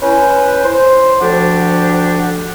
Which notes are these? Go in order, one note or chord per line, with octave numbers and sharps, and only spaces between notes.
C#4 E4 B4 C5 G#5
C5
D2 F3 D4 G4 F#5